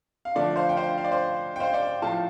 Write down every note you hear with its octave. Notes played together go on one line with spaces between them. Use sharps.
F5
D3 F3 A3 D5
C5 F5
G5
C5 F5
F5
D5
C5 F5
G5
C5 F5
D5 G5
A2 F3 A3 F5 A5